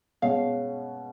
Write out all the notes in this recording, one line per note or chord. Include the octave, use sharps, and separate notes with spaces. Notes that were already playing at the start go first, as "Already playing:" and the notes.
B2 G#3 C#4 F5